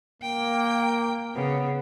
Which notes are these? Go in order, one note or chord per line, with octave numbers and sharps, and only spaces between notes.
A#3 G5
C#3 B3